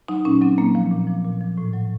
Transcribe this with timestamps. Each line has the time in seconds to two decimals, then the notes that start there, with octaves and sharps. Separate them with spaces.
0.08 F#3 D#4
0.25 A#2 C#4
0.41 F#3 C4
0.58 A#2 A#3
0.75 F3
0.91 A#2
1.07 F3
1.25 A#2
1.41 F3
1.58 A2
1.73 F#3